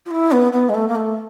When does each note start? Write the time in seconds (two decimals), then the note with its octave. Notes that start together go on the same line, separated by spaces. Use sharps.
0.05 F4
0.10 E4
0.32 B3
0.52 B3
0.69 G#3
0.74 A3
0.88 A#3
0.95 A3